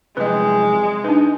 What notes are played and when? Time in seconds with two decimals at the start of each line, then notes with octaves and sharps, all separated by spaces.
0.17 F#2 C3 F3 G#3 B4 D#5
1.04 D4 D#4 B4